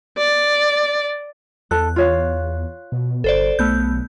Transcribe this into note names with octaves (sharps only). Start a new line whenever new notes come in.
D5
E2 A4 A5 F#6
F4 C#5 F5
B2
G1 A4 C5 D5
B1 A3 B3 G6